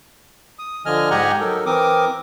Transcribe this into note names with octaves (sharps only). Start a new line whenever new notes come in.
D#6
D3 F3 D#5 G#5 F6
G#2 G4 D#5 F#5 G#5 A#5
F#3 D#4 A4 A#4
E3 C4 A#4 D6 D#6